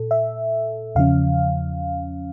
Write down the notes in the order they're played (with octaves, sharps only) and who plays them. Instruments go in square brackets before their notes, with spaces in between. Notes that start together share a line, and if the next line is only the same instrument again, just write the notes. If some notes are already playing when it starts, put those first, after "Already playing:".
Already playing: [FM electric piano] A#2 A4
E5
E2 C#3 F3 C#4 F5